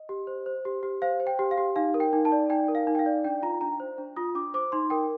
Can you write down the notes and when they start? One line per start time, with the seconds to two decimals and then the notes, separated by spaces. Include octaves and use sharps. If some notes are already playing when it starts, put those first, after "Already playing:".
Already playing: D#5
0.09 G4
0.27 C5
0.46 C5
0.65 G4
0.83 G4
1.02 C5 F5
1.20 C5
1.27 G5
1.39 G4
1.51 F5
1.58 G4
1.76 D#4 F5
1.94 A#4
2.00 G5
2.13 D#4
2.25 A5
2.32 D5
2.50 D#4 G5
2.68 A#4
2.75 F5
2.87 D#4
2.95 G5
2.99 F5
3.06 D5
3.24 D4 G5
3.42 F4 A#5
3.61 D4 A#5
3.80 C5
3.98 D4
4.16 F4 D#6
4.35 D4 D6
4.54 C5 D6
4.72 D#4 C6
4.90 A#4 G5